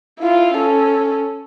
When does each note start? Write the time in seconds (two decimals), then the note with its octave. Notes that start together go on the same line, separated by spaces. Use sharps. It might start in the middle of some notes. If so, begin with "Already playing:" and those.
0.19 E4 F4
0.54 C#4 A4